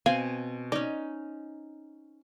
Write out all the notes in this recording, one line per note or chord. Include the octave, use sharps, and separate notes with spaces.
B2 C4 F5 G#5
C#4 D#4 D5